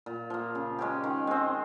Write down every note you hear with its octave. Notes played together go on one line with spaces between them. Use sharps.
A#2
F3 A#3
C#3
G#3 C#4 G4
D#3
G#3 C4